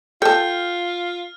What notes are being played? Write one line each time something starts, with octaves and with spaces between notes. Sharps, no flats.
F4 A4 G5 A5 F6